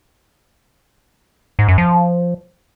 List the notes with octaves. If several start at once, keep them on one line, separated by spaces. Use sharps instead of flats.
G#2
F#2
F3